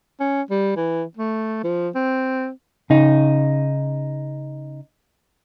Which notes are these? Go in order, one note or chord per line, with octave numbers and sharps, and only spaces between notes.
C#4
G3
E3
A3
F3
C4
C#3 D#4